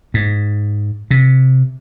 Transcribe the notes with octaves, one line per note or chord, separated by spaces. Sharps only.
G#2
C3